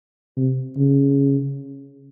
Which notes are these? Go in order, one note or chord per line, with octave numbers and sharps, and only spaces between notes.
C3
C#3